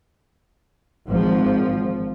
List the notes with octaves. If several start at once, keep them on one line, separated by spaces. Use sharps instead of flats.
G#1 F3